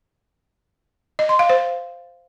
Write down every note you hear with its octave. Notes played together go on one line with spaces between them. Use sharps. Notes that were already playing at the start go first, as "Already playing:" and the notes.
D#5
C6
F5
C5